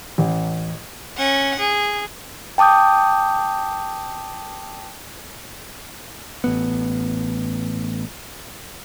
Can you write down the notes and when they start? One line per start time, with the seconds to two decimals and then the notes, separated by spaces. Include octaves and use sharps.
0.18 A1
1.17 C#4 F#5
1.59 G#4
2.58 G5 A5 D6 D#6 G6
6.44 A1 B3